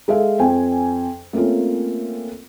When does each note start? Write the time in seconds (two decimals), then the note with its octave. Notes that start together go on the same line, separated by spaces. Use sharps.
0.08 G#3 G#4 A4 E5 F5
0.39 F2 G5 G#5
1.33 A3 A#3 C4 C#4 F4